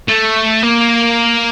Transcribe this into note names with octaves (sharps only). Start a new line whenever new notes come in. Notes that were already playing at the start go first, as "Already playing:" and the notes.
A3
A#3